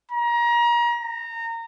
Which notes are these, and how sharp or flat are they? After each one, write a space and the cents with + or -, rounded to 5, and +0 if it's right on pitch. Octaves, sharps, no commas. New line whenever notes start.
A#5 +30
A#5 -20